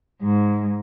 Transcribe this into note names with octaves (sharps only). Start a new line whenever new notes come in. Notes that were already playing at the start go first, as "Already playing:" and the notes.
G#2